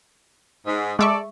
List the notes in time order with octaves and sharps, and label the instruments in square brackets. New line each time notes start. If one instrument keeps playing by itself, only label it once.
[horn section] G#2
[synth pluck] G#3 E5 C#6 [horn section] A4 D5